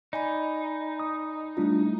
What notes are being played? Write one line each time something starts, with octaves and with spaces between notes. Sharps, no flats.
D#4 D5 G#5 B5
D#6
G3 A3 D4 E4 F4